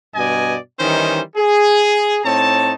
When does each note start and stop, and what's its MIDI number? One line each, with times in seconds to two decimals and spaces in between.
0.15 0.56 43
0.15 0.56 47
0.15 0.56 74
0.15 0.56 75
0.15 0.56 80
0.80 1.21 51
0.80 1.21 52
0.80 1.21 55
0.80 1.21 61
0.80 1.21 63
0.80 1.21 72
1.36 2.19 68
2.24 2.73 45
2.24 2.73 60
2.24 2.73 63
2.24 2.73 73
2.24 2.73 81